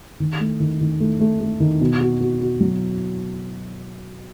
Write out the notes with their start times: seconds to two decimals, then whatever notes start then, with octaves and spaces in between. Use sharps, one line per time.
0.20 D#3
0.40 A3
0.60 D#3
0.81 D#3
1.00 A3
1.20 A3
1.41 A3
1.60 D#3
1.81 B2
2.01 F#4
2.21 F#4
2.41 F#4
2.60 F#3